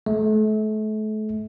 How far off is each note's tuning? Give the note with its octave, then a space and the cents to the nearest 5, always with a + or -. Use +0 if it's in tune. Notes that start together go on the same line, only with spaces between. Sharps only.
A3 -35